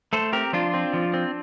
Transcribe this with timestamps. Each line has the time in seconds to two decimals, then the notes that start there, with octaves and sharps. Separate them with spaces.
0.13 A3 A4 C5
0.33 C4 G4 A#4
0.53 F3 D4 F4
0.74 C4
0.93 F3
1.14 C4